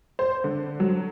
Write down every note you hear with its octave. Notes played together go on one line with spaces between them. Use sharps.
C5
D3
F#3